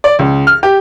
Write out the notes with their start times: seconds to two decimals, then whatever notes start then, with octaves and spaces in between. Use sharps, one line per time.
0.04 D5
0.19 C#2
0.47 F6
0.63 G4